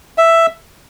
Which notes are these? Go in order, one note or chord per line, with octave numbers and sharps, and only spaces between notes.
E5